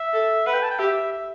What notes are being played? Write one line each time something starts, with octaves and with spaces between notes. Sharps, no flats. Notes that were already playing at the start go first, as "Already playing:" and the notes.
Already playing: E5
A4
B4 F#5
G5
A5
G5
G4 E5
E5